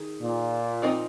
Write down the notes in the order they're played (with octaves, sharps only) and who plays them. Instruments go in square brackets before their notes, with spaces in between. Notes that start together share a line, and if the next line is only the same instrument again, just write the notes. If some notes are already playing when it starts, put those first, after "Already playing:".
Already playing: [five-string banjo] D#3 G#4
[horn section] A#2
[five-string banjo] F3 C4 D#4 A#4 D#5